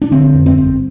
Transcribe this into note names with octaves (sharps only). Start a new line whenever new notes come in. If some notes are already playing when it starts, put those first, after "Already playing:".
D4
D3 C4
F2
C4
G1